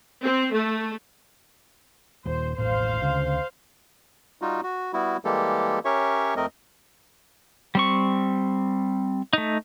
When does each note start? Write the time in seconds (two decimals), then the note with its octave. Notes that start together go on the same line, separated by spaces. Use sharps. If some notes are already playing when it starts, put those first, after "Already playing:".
0.23 C4
0.53 A3
2.26 D#1 C5
2.58 D#1 A1 A2 C5 F5
3.02 D2 C#3
4.42 G3 D#4 F4 F#4
4.63 F#4
4.93 G3 B3 E4 F#4
5.25 E3 G3 G#3 A#3 G4 A4
5.85 C#4 G4 A#4 C#5 E5 C#6
6.36 F2 A3 C4 A#4 D#5
7.75 G3 C4 C#6
9.33 A3 D#4